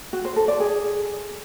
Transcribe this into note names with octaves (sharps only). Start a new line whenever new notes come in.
F#4
C5
A4
D5
G#4